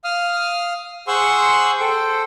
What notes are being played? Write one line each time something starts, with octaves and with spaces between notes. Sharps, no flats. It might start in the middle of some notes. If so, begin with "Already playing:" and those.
F5 D#6 F6
G#4 C5 F#5 C6 C#6 E6
A4 C5 G5